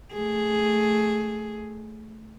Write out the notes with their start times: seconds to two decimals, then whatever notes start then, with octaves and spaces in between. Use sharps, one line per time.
0.13 A3 G#4